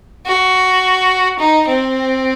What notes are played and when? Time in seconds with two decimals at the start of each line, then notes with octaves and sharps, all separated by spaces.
0.26 F#4
1.40 D#4
1.68 C4